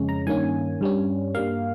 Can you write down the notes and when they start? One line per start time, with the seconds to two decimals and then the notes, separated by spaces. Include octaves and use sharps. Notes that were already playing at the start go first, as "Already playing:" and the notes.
Already playing: F2 C#3 G#3 C#4
0.09 A#5
0.27 G2 D#3 A#3 C#4 G#5
0.81 G2 G3 C#4
1.34 G2 G3 A#3 F5